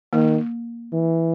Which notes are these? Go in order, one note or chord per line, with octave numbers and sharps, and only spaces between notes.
D#3 A#3
E3